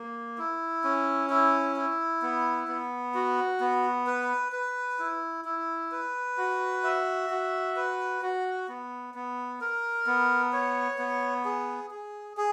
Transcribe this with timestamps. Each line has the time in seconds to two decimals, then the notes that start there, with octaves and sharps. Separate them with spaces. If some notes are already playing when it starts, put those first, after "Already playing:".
Already playing: A#3
0.38 E4
0.84 C#4
1.30 E4
1.76 E4
2.22 B3
2.68 B3
3.14 F#4
3.60 B3
4.07 B4
4.52 B4
4.99 E4
5.45 E4
5.92 B4
6.38 F#4
6.84 E5
7.30 F#4
7.76 B4
8.22 F#4
8.69 B3
9.14 B3
9.61 A#4
10.07 B3
10.53 C#5
10.98 B3
11.45 G#4
11.91 G#4
12.37 G#4